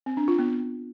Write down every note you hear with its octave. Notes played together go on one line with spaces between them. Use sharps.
C4
D4
F4
B3